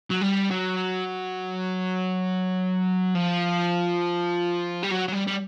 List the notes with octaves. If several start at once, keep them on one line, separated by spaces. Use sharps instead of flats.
F#3
G3
F#3
F3
G3
F#3
F#3
G3
G3